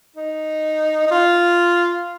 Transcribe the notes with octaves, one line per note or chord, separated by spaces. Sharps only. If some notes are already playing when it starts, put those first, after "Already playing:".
D#4
D#4
F4